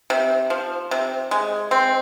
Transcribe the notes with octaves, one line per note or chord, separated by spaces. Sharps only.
C3
F3
C3
G#3
C4